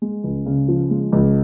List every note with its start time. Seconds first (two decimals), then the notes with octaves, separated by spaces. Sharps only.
0.02 G#3
0.24 C#2
0.46 C#3
0.68 F3
0.90 G#3
1.12 C#2